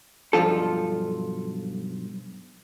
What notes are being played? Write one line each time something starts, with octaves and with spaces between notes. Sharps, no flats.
B1 G2 F3 F4 A4